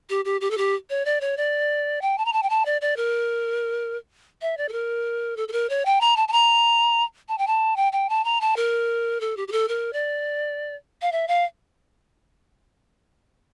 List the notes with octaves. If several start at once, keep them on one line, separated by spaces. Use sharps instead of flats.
G4
G4
G4
A4
G4
C#5
D5
C#5
D5
G5
A5
A#5
A5
G5
A5
D5
D5
A#4
E5
D5
A4
A#4
A4
A4
A#4
C#5
G5
A#5
A5
A5
A#5
A5
G5
A5
G5
G5
A5
A#5
A5
A#4
A4
G4
G4
A4
A#4
D5
F5
E5
F5